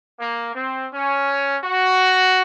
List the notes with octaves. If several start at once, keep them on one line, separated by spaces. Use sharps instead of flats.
A#3
C4
C#4
F#4